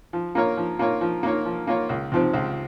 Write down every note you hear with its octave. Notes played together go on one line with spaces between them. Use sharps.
F3
A#3 F4 A#4 C#5
F3
A#3 F4 A#4 C#5
F3
A#3 F4 A#4 C#5
F3
A#3 F4 A#4 C#5
C#2
C3 F3 C4
C#2